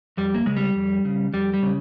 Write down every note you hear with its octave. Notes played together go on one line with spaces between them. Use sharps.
F2 G3
A#3
C#3 G#3
G3
F2
C#3
F2 G3
G3
C#3